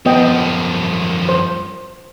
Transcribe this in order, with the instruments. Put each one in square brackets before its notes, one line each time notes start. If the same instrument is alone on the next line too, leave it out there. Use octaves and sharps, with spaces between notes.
[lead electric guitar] F#2 F3 [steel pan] B3 D#5 G5
[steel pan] C5